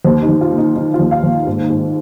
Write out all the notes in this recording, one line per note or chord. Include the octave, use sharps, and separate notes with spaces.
D#2 C5
D#4
D#2
F4
D#3
D#4
D#3 D#4
F4
D#2
F5
D#2
G#2
G#2